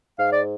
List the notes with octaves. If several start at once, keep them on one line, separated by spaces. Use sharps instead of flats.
G#2 F5
D5